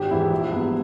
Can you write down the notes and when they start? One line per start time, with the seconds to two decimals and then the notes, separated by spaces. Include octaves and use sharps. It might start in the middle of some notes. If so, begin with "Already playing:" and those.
Already playing: G#1 G4
0.10 G#2 E3 G#3 E4
0.31 A#1
0.52 G#2 G3 B3